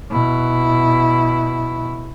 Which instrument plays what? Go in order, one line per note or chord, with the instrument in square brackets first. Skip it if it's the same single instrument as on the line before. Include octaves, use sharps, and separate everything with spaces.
[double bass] B2 E4